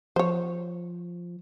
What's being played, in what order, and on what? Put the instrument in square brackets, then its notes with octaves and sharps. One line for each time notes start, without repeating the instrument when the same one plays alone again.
[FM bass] F3 [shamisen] C5 C#5